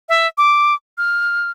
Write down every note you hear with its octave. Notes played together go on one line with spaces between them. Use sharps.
E5
D6
F6